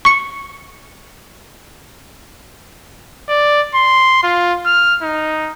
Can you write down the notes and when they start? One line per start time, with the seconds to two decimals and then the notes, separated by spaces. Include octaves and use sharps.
0.05 C#6 C#7
3.29 D5
3.75 C6
4.23 F4
4.66 F6
5.02 D#4